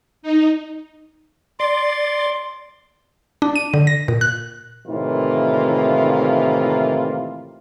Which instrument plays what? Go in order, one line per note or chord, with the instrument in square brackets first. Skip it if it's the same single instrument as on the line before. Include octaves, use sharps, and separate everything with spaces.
[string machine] D#4
[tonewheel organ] D5 [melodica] C6
[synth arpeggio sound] D4
D#7
D3
A#6
A#2
F#6
[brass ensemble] A2 C3 D#3 E3 A#3 F4